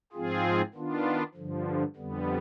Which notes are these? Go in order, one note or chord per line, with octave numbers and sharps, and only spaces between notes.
G#2 F3 C4 F4 G#4
D#3 B3 D4 F4
G2 D3 F3
F2 D3 G3 B3